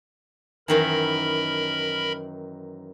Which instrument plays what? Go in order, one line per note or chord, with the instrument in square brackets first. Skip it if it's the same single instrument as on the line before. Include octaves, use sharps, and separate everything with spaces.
[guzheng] F#2 D#3 E3 [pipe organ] A#4 B5